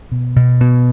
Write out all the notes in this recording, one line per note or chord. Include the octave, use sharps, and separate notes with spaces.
B2
B2
B2